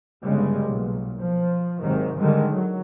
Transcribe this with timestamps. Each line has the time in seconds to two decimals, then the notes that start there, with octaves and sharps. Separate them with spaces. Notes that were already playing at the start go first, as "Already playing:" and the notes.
0.24 G1 C#3 G3 G#3
0.66 B1 A#2
1.20 F3
1.81 G#1 G#2 C3 D#3 F#3
2.18 D3 D#3 G3 G#3
2.51 F#3